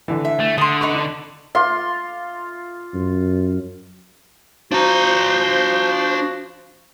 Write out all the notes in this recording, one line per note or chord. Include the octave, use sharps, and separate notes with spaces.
D3 E3
E5
A3
D3 C6 D#6
D#4 B4 C#6 D6
D4
F4 C6 D6
F#2
F3 D4 F#4 C5 A#5 G6